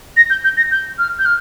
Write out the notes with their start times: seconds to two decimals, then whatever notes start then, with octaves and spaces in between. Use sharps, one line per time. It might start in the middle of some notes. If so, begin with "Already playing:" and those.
0.17 A#6
0.30 G6
0.44 G6
0.57 A#6
0.71 G6
0.98 F6
1.19 G6
1.25 F6